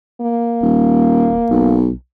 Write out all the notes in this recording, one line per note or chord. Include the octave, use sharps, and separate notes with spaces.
A#3
D#1
B1